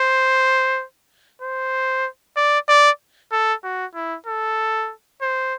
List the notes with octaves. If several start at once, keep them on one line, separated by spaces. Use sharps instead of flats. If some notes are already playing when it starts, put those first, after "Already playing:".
Already playing: C5
C5
D5
D5
A4
F#4
E4
A4
C5